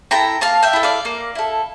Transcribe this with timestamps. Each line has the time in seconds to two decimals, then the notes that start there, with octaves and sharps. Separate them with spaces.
0.11 E4 A4 G5 A#5
0.41 A#3 F5 A5
0.63 E5 G5
0.73 E4 A4
0.83 D5 F5
1.05 A#3
1.35 E4 A4